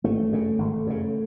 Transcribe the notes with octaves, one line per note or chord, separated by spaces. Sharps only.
G#1 A3
F#2 C#3
G#1
F#2 C#3